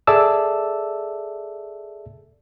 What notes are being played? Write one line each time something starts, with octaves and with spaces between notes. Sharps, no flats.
G#4 A4 D5 E5 A5 E6